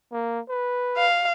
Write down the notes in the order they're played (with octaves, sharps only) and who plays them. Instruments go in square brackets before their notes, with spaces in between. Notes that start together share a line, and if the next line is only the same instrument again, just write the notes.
[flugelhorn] A#3
B4
[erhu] F5